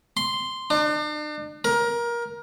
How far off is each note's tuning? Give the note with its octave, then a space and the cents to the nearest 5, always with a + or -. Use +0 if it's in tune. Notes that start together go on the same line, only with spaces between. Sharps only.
C6 -5
D4 +40
A#4 +20